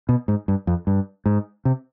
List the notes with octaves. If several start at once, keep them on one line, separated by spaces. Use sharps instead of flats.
B2
G#2
G2
F2
G2
G#2
C3